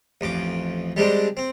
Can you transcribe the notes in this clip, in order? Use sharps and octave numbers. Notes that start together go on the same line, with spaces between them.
A1 F2 D6
G3 G#3 C4 D4
C4